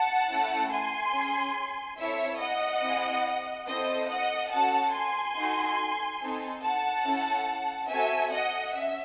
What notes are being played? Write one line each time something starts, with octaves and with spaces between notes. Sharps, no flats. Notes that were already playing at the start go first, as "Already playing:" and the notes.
Already playing: F#5 A5
A3 C#4 E4 A4
G#5 C6
C#4 G#4
C4 E4 A4 C#5 E5
D#5 F#5
C4 E4 G#4
C4 E4 A4 C5 D#5
D#5 F#5
C#4 F#4 A4 F#5 A5
G#5 C6
D#4 F#4 A4
C4 D#4 A4
F#5 A5
C#4 E4 A4
C4 F#4 A4 E5 G#5
D#5 F#5
C#4 E5